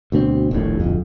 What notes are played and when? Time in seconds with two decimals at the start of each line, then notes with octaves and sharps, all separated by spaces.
0.12 D2 B2 A3 C4
0.51 D#1 A#1 D#2 A2
0.80 D1 G1 F2